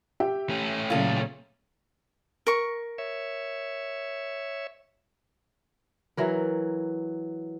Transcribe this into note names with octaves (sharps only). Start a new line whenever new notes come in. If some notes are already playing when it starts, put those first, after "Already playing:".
G4 E5 G5
A3 C#4
A#2 C#3 F#3 F4 A4
A#4 C#6
C#5 E5
E3 F#3 A#4